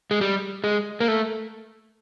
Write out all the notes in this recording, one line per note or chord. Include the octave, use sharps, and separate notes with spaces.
G#3
G3
G#3
A#3
A3